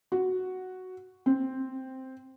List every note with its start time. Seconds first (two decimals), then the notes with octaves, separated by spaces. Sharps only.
0.12 F#4
1.26 C4